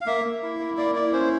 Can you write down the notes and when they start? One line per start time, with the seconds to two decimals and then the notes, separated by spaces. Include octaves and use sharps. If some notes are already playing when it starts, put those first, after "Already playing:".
0.01 F5
0.06 A#3 E5
0.24 A#3
0.43 E4
0.59 A#3
0.77 A#3 D5
0.95 E4 D5
1.13 C#4 C5